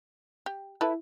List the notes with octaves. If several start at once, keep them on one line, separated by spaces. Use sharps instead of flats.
G4
E4 A4 B4